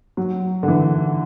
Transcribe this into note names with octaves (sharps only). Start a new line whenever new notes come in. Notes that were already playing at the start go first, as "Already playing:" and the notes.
F#3
D3
E3